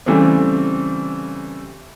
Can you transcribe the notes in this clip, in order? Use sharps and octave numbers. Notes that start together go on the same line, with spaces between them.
C#3 E3 G3 A3 C4